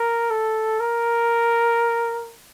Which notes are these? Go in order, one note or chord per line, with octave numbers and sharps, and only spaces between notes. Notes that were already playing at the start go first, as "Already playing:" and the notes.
Already playing: A#4
A4
A#4